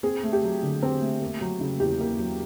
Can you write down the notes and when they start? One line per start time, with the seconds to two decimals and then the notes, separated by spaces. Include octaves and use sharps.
0.03 C4 G#4
0.23 A3
0.33 G4
0.43 F#3
0.62 D3
0.83 C4
1.01 A3
1.21 A#3
1.41 F#3
1.61 C#3
1.80 E2 G4
2.00 A#3
2.19 F#3